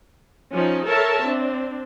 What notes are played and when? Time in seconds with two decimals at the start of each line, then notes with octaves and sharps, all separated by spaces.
0.53 F3 C#4 D#4
0.86 A4 A#4 C#5 E5 A5
1.26 C4 D4